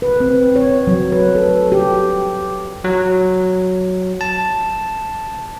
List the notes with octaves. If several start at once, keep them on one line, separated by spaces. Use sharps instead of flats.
B4
C4
C#5
F#3
B4
A4
G4
F#3
A5